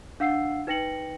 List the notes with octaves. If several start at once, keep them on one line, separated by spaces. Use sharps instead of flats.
D4 F5 F#5 E6 C7
D#4 B4 G5 A#6 C#7 F#7